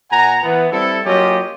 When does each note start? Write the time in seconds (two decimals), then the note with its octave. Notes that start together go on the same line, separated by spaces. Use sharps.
0.11 A#2 F#5 G#5 A#5
0.43 E3 B3 F#5
0.72 G3 C4 E4 A4
1.06 F#3 A#3 C#4 F4 G4 D#5